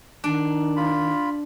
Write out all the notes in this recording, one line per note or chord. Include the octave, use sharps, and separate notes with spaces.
D#3 D4
F4 B5